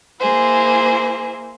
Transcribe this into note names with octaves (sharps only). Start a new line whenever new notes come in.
A#3 E4 G#4 C5